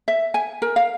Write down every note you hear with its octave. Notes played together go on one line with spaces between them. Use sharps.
E5
G#5
A#4
F5